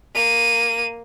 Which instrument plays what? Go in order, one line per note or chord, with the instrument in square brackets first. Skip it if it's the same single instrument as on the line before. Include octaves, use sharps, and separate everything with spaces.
[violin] A#3 D#7